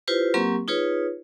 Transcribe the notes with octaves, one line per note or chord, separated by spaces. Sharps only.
E4 F4 G4 B4 C5
F#3 A#3 C4 G4 A#4 C#6
D#4 F4 G#4 B4 C#5